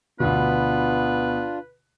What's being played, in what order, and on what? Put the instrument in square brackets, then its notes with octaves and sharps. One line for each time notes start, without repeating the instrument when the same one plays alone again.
[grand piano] D2 B2 [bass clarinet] B3 [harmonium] D4 F4 [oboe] B4